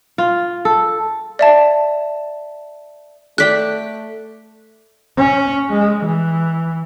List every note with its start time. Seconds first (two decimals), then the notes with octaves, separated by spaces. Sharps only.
0.18 F4
0.65 A4
1.39 D5 E5 A5
3.38 A3 A4 D5 G5 F#6 B6
5.18 C#4
5.70 G#3
6.06 E3